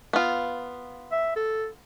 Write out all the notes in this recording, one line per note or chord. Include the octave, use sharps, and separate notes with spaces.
B3 F4
E5
A4